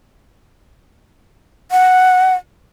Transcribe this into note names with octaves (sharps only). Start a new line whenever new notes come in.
F#5